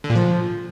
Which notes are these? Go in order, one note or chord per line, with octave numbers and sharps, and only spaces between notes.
D3
A#2
F3